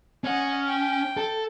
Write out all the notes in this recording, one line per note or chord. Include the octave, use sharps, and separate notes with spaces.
C#4 D#5 F#5
G5
A4